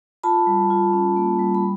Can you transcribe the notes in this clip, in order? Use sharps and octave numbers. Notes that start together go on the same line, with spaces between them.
F4 A5 B5
G3
F4
C#4
A#3
G3
B5